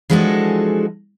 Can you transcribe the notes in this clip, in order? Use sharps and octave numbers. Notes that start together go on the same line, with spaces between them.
E3 F3 G#3 D4 F#4 A4